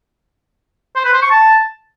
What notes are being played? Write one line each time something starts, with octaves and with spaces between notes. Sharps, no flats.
C5
B4
C5
C#6
A5